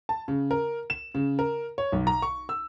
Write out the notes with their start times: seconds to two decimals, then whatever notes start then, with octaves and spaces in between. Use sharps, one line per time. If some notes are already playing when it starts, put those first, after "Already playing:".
0.09 A5
0.28 C#3
0.51 A#4
0.90 E7
1.15 C#3
1.39 A#4
1.78 C#5
1.92 B1
2.07 A#5
2.22 C#6
2.49 E6